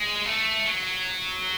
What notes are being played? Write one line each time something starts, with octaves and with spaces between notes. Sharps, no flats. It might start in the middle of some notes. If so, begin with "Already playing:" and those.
Already playing: G#3
A3
F#3